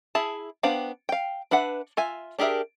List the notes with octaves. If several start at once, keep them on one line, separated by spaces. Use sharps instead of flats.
E4 G#4 E5 A5
B3 D4 C5 F5 G5
F5 G5
D4 B4 E5 F#5
F4 E5 G#5
D4 G4 G#4 A#4 E5